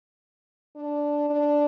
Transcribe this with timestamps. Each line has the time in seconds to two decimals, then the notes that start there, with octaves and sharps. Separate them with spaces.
0.76 D4
1.30 D4